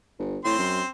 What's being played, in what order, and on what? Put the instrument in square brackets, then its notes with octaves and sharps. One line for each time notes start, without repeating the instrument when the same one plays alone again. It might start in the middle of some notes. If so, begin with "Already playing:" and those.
[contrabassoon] G1
[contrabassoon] A2 [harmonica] C4 C6
[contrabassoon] F#2